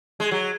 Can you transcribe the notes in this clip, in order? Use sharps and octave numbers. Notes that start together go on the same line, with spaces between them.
G#3
F#3